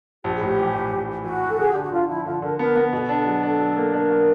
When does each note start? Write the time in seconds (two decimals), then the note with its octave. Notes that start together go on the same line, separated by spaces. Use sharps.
0.24 A#1 G4
0.35 G#4
0.41 A2 G4
0.58 E3
0.74 A#1
0.92 A#1
1.08 E3
1.24 E3 F#4
1.41 A#1
1.49 A4
1.58 D3 G#4
1.71 D3 G4
1.81 F#4
1.92 D3 F4
2.08 F3 E4
2.25 D3 F4
2.42 D3 A#4
2.59 B3 A#4
2.76 B3
2.92 B2 A4
3.09 D4
3.26 F#3 G#4
3.43 D4 A4
3.59 F#3
3.77 A#3
3.93 D4 A#4
4.10 F#3